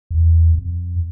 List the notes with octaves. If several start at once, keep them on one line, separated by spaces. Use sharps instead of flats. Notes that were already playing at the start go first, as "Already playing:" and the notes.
E2
F2